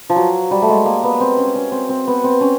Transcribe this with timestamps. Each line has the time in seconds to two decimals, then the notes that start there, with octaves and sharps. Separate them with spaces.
0.10 F3
0.16 F#3
0.51 G3
0.62 A3
0.69 G#3
0.86 A#3
1.04 B3
1.20 C4
1.38 C#4
1.55 C#4
1.72 C4
1.89 C4
2.07 B3
2.24 C4
2.41 C#4